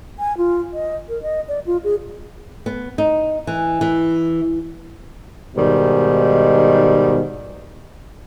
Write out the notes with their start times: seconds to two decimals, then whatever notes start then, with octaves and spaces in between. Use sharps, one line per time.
0.19 G#5
0.37 F4
0.73 D#5
1.09 A#4
1.22 D#5
1.48 D5
1.67 F4
1.84 G#4
2.66 B3
2.98 D#4
3.47 E3
3.81 E3
5.56 G#2 B2 D#3 G3